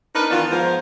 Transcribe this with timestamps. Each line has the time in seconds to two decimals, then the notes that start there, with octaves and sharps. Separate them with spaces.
0.15 D4 D#4 A#4 B4
0.31 D#3 E3 B3 D4 F4
0.51 G#2 F3 B3 A#4 C5 F5